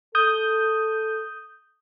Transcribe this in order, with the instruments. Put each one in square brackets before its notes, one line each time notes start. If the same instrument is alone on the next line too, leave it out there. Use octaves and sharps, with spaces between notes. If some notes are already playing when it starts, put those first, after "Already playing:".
[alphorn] A4 [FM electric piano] D#6 G6